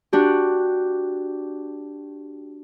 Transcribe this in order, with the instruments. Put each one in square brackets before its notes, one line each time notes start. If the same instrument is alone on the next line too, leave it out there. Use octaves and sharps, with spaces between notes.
[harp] D4 F#4 G4